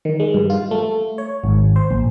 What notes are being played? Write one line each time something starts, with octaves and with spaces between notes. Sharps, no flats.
D#3
G#3
G2
F4
A3
C#5
G#1
C5
A#1